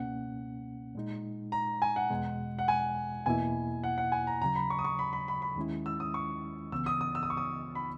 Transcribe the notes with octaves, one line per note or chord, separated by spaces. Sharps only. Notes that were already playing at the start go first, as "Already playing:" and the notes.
Already playing: C#2 B2 A#3 C#4 F#5
A#2 G#3 D#4
A#5
G#5
F#5
E2 B2 G#3
F#5
G#5
E2 B2 A#3 E4 G#5
F#5
F#5
G#5
A#5
D#2 C#3 F#3 A#5
B5
C#6
D#6
C#6
B5
B5
B5
B5
D#2 D#3 G#3 C#4 E4
E6
D#6
C#6
C#2 C#3 E3 B3 E6
D#6
D#6
E6
D#6
C#6
D#6
B5